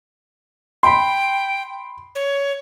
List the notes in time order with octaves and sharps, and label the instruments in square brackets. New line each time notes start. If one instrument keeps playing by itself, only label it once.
[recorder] G5 [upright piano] B5 C6
[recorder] C#5